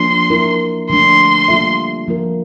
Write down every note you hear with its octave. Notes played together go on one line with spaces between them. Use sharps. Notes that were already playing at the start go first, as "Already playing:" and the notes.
Already playing: F3 A#3 D4 C6
A#3 E4 A#4
D3 F3 A3 D4 C6
G3 A#3 F4 A4 E5
F3 A#3 F4 A#4